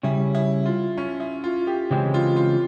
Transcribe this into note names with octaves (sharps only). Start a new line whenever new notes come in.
C#3 G3 C#4 E4
E4
F4
C#4
E4
F4
G4
C#3 E3 G#3 C4 G4
F4
F4